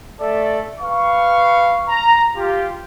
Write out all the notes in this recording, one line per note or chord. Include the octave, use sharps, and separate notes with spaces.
A3 A4 D5 E5
B4 F5 C#6
A#5
F4 G4